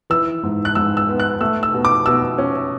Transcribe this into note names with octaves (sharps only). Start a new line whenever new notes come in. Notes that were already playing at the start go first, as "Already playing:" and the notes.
E3 E6
G#2
F#6
G#2 E6
E6
B3
F#6
A3 E6
E6
B2
D6
B2 E6
C#4